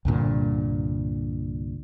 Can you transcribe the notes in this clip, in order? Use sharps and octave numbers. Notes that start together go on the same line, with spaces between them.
C2 G2 A#2 D3